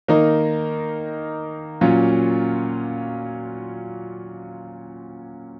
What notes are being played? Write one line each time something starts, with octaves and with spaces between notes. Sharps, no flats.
D#3 A#3 D#4 A#4
A#2 F#3 C#4 F4